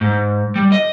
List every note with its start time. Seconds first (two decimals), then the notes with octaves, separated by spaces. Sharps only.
0.01 G#2
0.56 G3
0.72 D#5